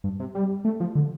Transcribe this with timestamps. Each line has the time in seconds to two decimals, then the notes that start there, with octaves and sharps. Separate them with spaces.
0.04 G2
0.20 C3
0.35 G3
0.65 A3
0.80 F3
0.95 D3